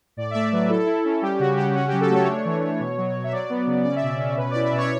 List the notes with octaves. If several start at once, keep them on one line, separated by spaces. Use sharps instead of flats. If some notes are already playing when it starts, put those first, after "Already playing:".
A2 D5
E5
A3 D5
F#3 B4
E4 A4
E4
C#4
G3 G4
C#3 F#4
C#3 G4
C#4 F#4
F#3 G4
A4
A3 C#5
D4
E3
E3
B2
F#3
F#3
E5
F#3 D5
B3
C#3
C#4 D5
E5
B2 D5
C#4
B2 B4
E4 D5
E5
B2 C#5